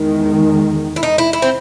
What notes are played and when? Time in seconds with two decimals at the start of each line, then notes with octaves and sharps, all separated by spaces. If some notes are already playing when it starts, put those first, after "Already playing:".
Already playing: E2 D#3 G#3
0.96 E4
1.03 D#4
1.18 E4
1.33 E4
1.42 C4